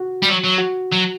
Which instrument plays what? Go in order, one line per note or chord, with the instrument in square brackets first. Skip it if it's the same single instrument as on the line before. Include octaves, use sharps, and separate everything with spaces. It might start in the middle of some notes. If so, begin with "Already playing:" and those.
Already playing: [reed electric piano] F#4
[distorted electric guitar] G3
F#3
F#3
[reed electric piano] F#4
[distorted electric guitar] F#3